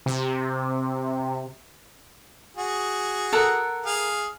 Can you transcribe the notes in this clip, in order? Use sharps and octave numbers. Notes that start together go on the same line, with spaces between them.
C3
F#4 G#4
A4 A#4 F#5
G#4 F5